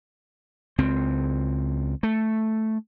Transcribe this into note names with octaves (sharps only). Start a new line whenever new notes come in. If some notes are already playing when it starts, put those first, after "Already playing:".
C#2 C4
A3